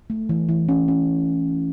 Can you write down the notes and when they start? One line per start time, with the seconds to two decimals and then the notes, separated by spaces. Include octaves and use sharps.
0.10 A3
0.29 E3
0.49 E3
0.69 C#4
0.88 C#4